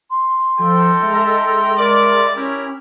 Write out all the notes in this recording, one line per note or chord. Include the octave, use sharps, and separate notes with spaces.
C6
F3 D#4 A4 G5
G#3 E5 A#5
G3 A#4 D5
C#4 E4 G4 A#4